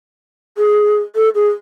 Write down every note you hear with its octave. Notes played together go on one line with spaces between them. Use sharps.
G#4
A4
G#4